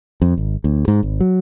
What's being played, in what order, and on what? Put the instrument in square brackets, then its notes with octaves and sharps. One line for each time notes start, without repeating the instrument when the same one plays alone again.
[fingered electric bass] F2
G#1
D2
G#2
G#1
F#3